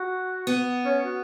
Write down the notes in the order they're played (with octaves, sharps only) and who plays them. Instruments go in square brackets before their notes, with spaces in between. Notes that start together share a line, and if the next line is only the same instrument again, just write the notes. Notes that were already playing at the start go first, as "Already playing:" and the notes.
Already playing: [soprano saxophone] F#4
[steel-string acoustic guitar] B3
[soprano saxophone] C#4
F#4